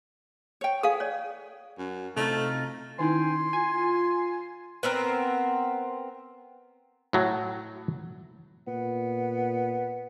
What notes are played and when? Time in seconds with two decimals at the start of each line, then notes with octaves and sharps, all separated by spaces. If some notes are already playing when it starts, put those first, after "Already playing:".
0.61 C#5 G5
0.83 G#4 A4 F5
1.00 C#5 D5
1.78 F#2
2.16 C3 A3 D#4 F4
2.99 D#3 C#4 D#4 E4 G5 G#5 C6
3.53 F4 G#5
4.83 B3 C4 A#4
7.13 A2 F#3 A3
8.67 A#2 B3